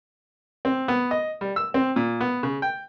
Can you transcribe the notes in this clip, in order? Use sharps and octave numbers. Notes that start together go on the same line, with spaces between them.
C4
B3
D#5
G3
E6
C4
A#2
B3
C#3
G5